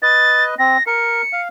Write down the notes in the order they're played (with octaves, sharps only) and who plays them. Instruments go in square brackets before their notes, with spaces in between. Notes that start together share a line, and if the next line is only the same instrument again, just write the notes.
[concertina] B4 D#5 [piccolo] A6
[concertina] C4 [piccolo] A#6
[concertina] A#4 [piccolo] C#7
[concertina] F5